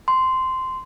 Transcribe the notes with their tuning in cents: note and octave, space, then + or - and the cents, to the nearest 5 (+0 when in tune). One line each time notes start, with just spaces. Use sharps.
C6 -10